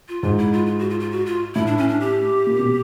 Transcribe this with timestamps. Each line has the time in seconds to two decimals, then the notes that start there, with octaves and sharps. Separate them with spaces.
0.09 F4
0.23 G#2 F4
0.38 E4
0.52 F4
0.67 F4
0.79 F#4
0.90 F4
1.00 F4
1.11 F#4
1.26 F4
1.55 A2 E4
1.67 D4
1.78 C#4
1.89 D4
2.00 G4
2.47 A#2
2.59 B2